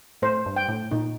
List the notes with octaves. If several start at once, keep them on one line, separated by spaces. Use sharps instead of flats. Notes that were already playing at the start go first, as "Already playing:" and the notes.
A2 C5
G2
G5
A2
A#2 D#4